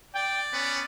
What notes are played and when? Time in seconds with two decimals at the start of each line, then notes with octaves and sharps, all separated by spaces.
0.15 D5 G5
0.53 B3 C#4